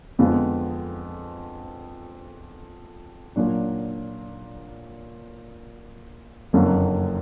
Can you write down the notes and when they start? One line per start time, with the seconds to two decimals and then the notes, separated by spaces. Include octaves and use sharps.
0.19 F2 D3 F3 G#3 B3
3.36 A#2 F#3 D4
6.53 F#1 F2 D3 F#3 A#3